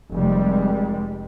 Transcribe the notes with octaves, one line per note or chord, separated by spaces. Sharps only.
F1 G3 G#3